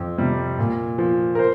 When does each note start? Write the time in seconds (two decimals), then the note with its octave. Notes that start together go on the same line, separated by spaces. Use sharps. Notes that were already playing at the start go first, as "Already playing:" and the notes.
Already playing: F2
0.18 C3 G3
0.58 A#2
0.98 F3
1.35 A#4
1.39 C5